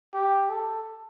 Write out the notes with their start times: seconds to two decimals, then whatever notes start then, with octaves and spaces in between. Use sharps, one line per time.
0.14 G4
0.49 A4